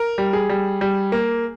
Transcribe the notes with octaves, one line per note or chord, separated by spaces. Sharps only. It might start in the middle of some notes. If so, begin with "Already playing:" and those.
Already playing: A#4
G3
G#4
G3
G3
A#3